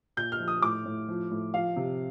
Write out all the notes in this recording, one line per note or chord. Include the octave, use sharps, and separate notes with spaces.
A#2 G6
F6
F3
D#6
A2 D6
A2
F3
A2
F3 F5
C3